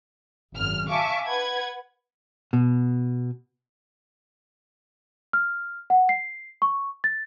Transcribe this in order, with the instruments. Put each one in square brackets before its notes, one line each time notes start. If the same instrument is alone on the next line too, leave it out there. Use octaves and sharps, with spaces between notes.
[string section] G#1 F#2 F6
E5 F5 G#5 A5 C#6 D6
B4 F#5 G#6
[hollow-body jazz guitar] B2
[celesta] F6
F#5
C7
C#6
A6